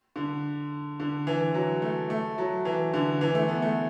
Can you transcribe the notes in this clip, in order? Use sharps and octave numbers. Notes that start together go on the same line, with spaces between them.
D3
D3
E3
F#3
A3
A3
F#3
E3
D3
E3
A3
B3
A3